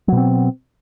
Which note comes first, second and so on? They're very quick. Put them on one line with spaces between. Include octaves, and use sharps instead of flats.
F#3 B2 C4